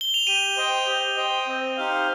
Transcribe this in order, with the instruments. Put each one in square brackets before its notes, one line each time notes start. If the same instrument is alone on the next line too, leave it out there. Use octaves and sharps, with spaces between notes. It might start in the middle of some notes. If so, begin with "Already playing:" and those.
[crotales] G7
F7
[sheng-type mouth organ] G4 [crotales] D#7
[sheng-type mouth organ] C5 D#5 G5
G4
C5 D#5 G5
C4
D#4 G4 C5 F5